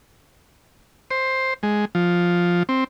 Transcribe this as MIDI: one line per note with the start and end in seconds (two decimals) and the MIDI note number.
1.11 1.54 72
1.63 1.85 56
1.95 2.63 53
2.69 2.84 60